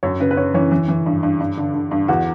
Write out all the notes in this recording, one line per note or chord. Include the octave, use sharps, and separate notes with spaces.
F#2 C#5
C#3 B4
B4
C#3 C#5
E3 C#5
E3
E3
G2
G2
G2
D3
D3
G2
E2 F#4